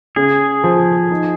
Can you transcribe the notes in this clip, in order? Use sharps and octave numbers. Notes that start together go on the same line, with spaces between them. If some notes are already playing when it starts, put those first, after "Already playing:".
C#3 G#4
F3
D#4